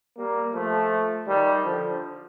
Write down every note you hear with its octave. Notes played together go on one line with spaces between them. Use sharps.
G3 A#3
F3 A3
D#3 G3
D3 F3